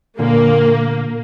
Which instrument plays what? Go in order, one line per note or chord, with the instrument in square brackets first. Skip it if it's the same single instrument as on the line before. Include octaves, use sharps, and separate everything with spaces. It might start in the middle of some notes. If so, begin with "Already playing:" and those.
[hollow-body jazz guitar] A#2 D3 [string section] A#3